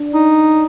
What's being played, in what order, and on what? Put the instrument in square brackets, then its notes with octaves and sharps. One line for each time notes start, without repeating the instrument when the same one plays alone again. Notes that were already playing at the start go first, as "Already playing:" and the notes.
Already playing: [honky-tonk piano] D4
[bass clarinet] D#4